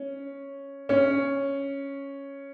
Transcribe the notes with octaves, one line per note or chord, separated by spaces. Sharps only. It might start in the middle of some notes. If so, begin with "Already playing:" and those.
Already playing: C#4
C#4